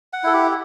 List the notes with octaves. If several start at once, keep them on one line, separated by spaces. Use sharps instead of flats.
F#5
E4 A4
G4